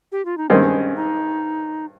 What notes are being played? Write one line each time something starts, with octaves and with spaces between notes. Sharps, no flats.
G4
F4
D#4
G2 D#3 G#3 C4 C#4
D#4